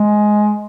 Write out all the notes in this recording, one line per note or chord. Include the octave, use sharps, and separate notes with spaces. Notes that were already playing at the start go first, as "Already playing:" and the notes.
Already playing: G#3